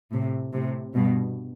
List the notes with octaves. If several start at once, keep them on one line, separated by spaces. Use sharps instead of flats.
A2 C3
A2 C3
G2 B2